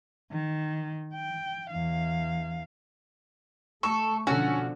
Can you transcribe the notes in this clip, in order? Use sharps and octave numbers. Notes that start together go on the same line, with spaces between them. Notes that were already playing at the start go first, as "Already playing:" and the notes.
D#3
G5
E2 F5
A3 A4 C#6
B2 D3 F3 C#4 F#4 A4